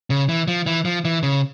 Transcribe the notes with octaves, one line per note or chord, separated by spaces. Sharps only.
C#3
E3
F3
E3
F3
E3
C#3